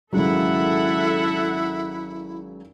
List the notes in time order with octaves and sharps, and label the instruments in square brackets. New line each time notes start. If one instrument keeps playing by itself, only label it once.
[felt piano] G#1 C#3 F#3 [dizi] E4 [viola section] A4 E5 F#5